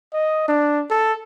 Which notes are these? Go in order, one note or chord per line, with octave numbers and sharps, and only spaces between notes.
D#5
D4
A4